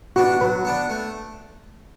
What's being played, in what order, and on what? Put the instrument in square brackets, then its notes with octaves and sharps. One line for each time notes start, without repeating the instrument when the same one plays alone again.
[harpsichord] B3 D4 [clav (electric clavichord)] F#4
[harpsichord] F#3 [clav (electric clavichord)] B4
[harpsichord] B3 D4
A3